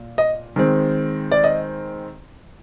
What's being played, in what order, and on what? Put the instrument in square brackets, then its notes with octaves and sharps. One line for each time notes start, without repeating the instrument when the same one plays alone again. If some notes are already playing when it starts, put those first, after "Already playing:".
Already playing: [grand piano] A#2
D#5
D#3 G#3 C4
D5
D#5